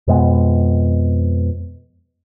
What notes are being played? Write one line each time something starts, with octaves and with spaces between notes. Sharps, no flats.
F2 B2 G#3 B3